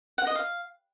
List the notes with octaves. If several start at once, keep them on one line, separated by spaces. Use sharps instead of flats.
F#5
D#5
F5